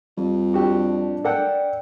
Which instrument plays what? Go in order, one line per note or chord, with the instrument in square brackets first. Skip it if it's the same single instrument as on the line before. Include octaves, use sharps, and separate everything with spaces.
[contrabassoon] F2 [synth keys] G3
[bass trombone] D4 [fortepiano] F#4 G4
[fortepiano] A4 A#4 F#5 [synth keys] D5 G5